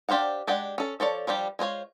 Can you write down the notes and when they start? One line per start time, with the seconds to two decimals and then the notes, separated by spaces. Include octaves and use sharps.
0.09 D4 G4 C5 F5 F#5
0.47 G#3 D4 G4 D5 F#5
0.78 C#4 A4
1.00 F3 A4 C#5 D5
1.27 F3 G3 D4 G4
1.59 G#3 F4 C5 C#5